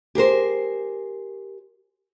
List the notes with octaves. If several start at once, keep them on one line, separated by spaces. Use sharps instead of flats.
G4 G#4 A#4 C5